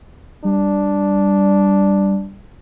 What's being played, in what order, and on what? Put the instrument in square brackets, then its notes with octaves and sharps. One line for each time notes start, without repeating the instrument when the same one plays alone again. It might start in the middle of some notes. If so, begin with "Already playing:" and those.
[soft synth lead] G3 [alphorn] D4